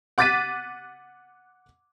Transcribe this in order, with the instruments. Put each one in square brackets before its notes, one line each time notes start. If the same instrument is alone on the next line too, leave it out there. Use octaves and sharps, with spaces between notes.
[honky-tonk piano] F#5 D6 F#6 A6 B6 D#7